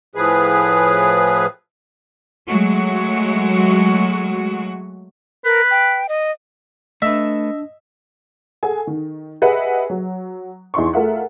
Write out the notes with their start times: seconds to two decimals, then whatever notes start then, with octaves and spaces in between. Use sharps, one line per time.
0.15 A2 F3 G#4 B4
2.46 F#3 G#3 A3 F#4
5.45 A#4 B4
5.71 G5
6.09 D#5
7.02 A3 D4 B4 D#5 E5
8.63 G#4 A4 F#5 G#5
8.87 D#3
9.42 G4 G#4 B4 D#5 E5 F#5
9.90 F#3
10.74 E2 D#4 E4 C6 C#6
10.93 A3 F4 G#4 A#4 E5 F#5